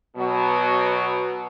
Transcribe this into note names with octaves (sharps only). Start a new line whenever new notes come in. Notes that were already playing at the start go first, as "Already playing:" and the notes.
B2 F#3